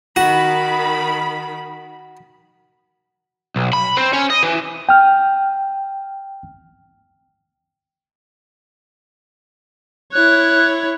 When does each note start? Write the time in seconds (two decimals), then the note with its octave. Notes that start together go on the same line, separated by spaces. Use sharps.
0.16 D#3 F#4 B5
3.56 B1
3.73 B5
3.97 C4
4.13 C#4
4.30 D#5
4.43 E3
4.89 G5 F6
10.12 E4 C#5 F#6